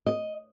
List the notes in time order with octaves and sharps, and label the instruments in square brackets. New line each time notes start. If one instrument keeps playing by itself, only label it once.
[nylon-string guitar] D#5